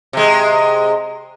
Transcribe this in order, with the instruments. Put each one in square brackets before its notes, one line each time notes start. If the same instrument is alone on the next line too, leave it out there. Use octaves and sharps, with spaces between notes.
[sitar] C3 G#3